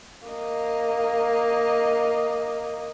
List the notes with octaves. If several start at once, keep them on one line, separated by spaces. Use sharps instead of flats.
A#3 D#5